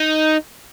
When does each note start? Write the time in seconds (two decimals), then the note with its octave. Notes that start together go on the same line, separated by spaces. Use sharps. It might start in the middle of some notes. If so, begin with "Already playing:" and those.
Already playing: D#4